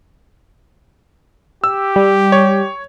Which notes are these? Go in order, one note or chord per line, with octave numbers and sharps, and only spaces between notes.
G4 E6
G3
C#5